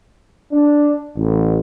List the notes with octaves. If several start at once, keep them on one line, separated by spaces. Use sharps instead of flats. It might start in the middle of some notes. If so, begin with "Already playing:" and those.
D4
A1